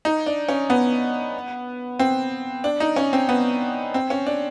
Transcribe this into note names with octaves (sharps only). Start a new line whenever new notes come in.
D#4
D4
C#4
B3
C4
D4
D#4
C#4
C4
B3
C4
C#4
D4